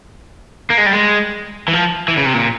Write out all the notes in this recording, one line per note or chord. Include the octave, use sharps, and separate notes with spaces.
A#3
G#3
G3
G#3
E3
F3
E3
C#3
C3
A#2